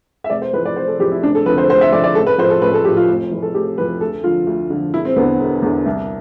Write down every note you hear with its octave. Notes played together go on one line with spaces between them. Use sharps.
E5
F1 D5
C5
F2 E3 B4
D5
F1 C5
A4
F2 E3 G4
E4
F1 D4
A4
F2 D3 B4
C5
F1 C5
E5
F2 D3 D5
D5
A1 A4
B4
A2 F3 C5
A4
A1 B4
A4
A2 F3 G4
F4
F1
F2 E3
A4
F1 G4
F2 E3 B4
D2 A4
D3 F3 F4
D2
D3 F3
E1 E4
C4
E2 D3 B3
E1
E2 D3
C2